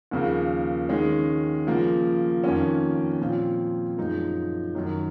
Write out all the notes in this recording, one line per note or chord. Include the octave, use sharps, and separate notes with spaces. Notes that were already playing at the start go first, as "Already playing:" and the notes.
D#2 C#3 F3 A#3
D#3 G#3 C#4
C#3 F3 A#3
F2 D#3 A#3 C#4
A#2 F3 C4 F4
F#2 F3 G#3 D#4
F#2 D#3 F#3